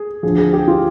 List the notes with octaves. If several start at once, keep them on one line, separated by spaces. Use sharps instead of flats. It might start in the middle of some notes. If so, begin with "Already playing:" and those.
Already playing: G#4
D2 D3 F3 G#4
G#4
G4
F4